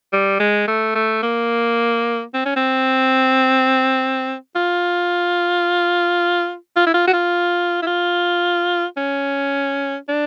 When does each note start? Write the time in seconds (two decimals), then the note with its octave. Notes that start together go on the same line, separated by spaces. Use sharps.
0.13 G3
0.40 G#3
0.68 A3
0.95 A3
1.23 A#3
2.34 C4
2.46 C#4
2.56 C4
4.56 F4
6.76 F4
6.86 E4
6.94 F4
7.07 F#4
7.13 F4
7.82 E4
7.86 F4
8.97 C#4
10.09 D4